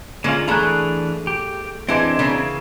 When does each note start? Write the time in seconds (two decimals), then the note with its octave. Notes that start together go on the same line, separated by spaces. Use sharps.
0.24 D3 G#3 A#3 C#4 F4
0.48 E3 A3 D4 G#4 A#5 F#6
1.27 G4
1.89 E3 G#3 C4 D4
2.19 C#3 E3 A#3